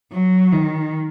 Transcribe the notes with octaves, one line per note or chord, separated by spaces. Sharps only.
F#3
D#3